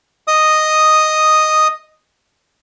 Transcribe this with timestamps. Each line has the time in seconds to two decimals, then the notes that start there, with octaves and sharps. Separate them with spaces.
0.28 D#5 D#6